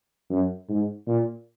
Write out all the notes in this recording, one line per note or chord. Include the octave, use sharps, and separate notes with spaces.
F#2
G#2
A#2